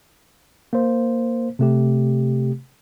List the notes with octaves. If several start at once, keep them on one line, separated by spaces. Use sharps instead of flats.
A#3 C5
C3 A3 G4